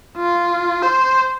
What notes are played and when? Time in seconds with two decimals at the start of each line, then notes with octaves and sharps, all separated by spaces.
0.18 F4
0.83 C5